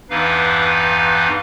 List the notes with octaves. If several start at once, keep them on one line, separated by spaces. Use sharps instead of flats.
E2 G2 E3 D#4 B4 F5